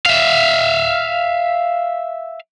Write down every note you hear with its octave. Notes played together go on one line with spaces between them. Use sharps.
E5 F5